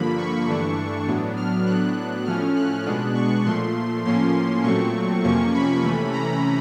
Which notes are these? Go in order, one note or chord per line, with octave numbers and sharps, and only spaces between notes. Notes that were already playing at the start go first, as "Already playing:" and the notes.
Already playing: G2 D3 F3 A#3 B5
C#6
G2 E3 A3 D4
A2 F#3 B3 D4
F6
A2 F#3 B3 D4 F#6
A2 F3 A3 C#4 F6
F#6
B2 G#3 B3 D4
C#6
A#2 F3 A3 C6
A2 F3 A#3 C#4 C6
A#2 F#3 A3 C4 C#6
F2 C3 F3 A#3 C#4 C#6
B5
C3 E3 A3 C#4
A#5